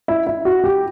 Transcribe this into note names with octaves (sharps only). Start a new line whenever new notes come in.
E4
E4
F#4
G4